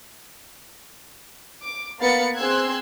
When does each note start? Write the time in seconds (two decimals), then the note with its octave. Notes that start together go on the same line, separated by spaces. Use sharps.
1.63 D6
1.99 A#3 B3 F5 B5 A6 C#7
2.36 C4 G#4 C6 E6 F#6 G#6